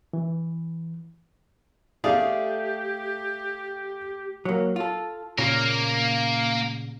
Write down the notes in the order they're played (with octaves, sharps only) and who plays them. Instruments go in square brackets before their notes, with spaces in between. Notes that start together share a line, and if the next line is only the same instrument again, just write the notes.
[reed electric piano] E3
[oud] A3 [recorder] G4 [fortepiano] G#4 D5 F5
[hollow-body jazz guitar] F#3 A#3
F4 A4
[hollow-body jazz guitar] A#2 C#3 F4 [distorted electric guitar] A#3 A#4